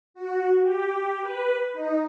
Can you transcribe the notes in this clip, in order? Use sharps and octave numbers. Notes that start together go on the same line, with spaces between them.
F#4
G4
B4
D#4